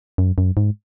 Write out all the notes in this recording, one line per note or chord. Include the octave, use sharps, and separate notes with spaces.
F#2
F#2
G#2